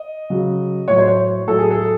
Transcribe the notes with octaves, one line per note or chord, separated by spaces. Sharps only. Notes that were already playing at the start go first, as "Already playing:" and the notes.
Already playing: D#5
C#3 F#3
A2 F#3 C#5
C5
C#5
A2 F#3 A4
G#4
A4